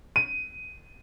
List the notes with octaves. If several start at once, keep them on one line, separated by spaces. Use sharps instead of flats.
D#7